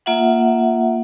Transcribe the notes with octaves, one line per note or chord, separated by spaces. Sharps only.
A#3 F4 E5 F#5